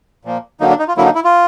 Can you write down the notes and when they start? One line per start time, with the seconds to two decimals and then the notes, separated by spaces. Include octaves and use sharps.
0.25 A#2 F3 A#3
0.60 D3 F#3 A#3 D#4
0.70 D4
0.79 D#4
0.88 F4
0.97 D3 F#3 A#3 E4
1.06 D#4
1.15 E4
1.25 F4